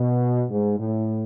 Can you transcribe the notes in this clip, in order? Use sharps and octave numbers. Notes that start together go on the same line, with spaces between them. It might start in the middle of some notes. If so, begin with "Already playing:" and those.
Already playing: B2
G#2
A2